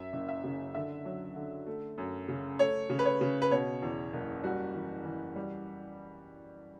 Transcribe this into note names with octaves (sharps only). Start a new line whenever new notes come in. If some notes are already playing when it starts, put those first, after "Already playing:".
Already playing: F#2 E5
F#1
E5
C#3
D3 E5
F#3
D3
A3
F#2
C#3
A3 C#5
C#3
B4
C#5
C#3
B4
B2 C#5
E2
F#1
G3 F#4
E3
E3
G3